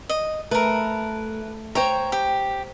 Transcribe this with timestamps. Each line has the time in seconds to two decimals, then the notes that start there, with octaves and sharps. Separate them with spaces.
0.09 D#5
0.51 A3 A#4 B4
1.75 C5 C#5 G5 A#5
2.12 G4